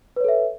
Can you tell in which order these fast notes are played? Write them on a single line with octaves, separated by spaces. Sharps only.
B4 C#5 A4 E5